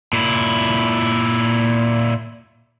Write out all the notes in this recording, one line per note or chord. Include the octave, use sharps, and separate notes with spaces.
A#2 E4